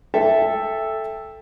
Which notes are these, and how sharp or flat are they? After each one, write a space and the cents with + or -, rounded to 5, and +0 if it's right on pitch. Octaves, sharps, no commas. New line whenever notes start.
A4 +0 E5 +0 G5 +20